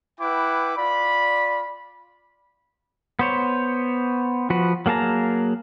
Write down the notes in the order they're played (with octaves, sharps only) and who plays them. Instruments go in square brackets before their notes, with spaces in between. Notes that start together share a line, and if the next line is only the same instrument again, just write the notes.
[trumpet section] E4 B4 F#5 G5 D6
F4 D5 B5
[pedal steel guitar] B3 C5 C#5
F3 F#4 B4
F#3 A#3 G#4 A5 A#5